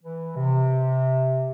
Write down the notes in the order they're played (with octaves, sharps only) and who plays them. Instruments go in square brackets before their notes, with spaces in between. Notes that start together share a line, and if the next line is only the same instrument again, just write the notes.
[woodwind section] E3
C3